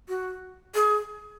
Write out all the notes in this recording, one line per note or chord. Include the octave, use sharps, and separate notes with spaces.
F#4
G#4